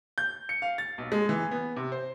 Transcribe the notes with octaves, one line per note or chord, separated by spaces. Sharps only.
G6
C#7
F5
A6
B1
G#3
E3
B3
C3
C5